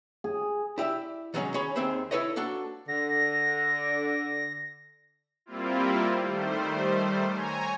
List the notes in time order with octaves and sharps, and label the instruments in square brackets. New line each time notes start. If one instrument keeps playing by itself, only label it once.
[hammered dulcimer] G#4
[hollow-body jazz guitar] E4 G4 D5 E5
D#3 F#3 G#3 A3 C#4 D#4
C#4 G#4 C#5 B5
D#2 D#3 C4 G#4 E5 B5
E4 A4 B4 C#5 D#5
A#3 D4 F#4 A4
[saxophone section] D3 [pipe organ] A#6
[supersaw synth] G3 A#3 C4 E4 F4
D#3 G3 A3 C5
C#5 G#5 A#5